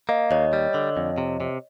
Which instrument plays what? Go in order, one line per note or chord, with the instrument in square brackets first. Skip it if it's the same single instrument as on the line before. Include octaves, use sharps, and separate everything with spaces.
[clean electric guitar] A#3 [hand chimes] D#5 F5
[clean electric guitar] D#2 [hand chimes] C#5 D#5
[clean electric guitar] G3
D3
F2
C3
C3